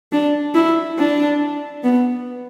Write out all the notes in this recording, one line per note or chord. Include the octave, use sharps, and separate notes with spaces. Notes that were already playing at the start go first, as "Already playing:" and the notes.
D4
E4
D4
B3